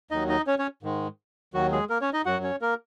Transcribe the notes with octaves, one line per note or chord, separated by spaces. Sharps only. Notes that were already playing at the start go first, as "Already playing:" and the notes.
D#2 D#3 F#3 D#4 D#5
D#4 D#5
C#4 C#5
C#4 C#5
G#2 D#3 G#3
D#2 D#3 F#3 F#4
G#3 G#4
A#3 A#4
C#4 C#5
D#4 D#5
F#2 F#3 F#4 F#5
C#4 C#5
A#3 A#4